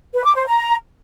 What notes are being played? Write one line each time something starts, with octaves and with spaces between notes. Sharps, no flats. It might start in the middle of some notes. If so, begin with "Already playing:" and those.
B4
D6
C5
A#5